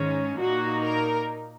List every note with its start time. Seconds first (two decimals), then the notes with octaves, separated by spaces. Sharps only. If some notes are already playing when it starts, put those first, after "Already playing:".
Already playing: G#2 D#3 G#3 C#4
0.38 A#2 A#3 D#4 F#4
0.84 A#4